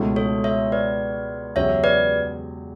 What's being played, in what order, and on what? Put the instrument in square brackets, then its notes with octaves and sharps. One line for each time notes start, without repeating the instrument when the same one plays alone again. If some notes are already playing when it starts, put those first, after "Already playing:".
Already playing: [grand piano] C#2 B2 A3 C#4 E4
[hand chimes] A4 C#5
C#5 E5
B4 D5
[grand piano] E2 C#3 F#3 C#4 G4 [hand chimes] C#5 E5
[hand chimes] B4 D5